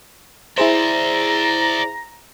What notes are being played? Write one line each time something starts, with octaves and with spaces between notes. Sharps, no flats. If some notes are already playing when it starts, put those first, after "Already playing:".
E4 G#4 C5 D5 E5 A#5